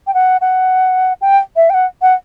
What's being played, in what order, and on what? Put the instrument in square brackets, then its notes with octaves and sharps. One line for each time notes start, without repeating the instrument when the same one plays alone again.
[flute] G5
F#5
F#5
G5
E5
G5
F#5
F#5